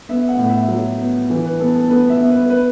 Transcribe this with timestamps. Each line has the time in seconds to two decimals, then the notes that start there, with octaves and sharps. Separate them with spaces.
0.09 B3 E5
0.29 F#5
0.38 A2
0.49 E5
0.69 F#3
0.99 B3
1.30 E3
1.44 B4
1.59 B3 A4
1.75 A4
1.89 B3 B4
2.09 E5
2.20 B3
2.30 B4
2.50 B4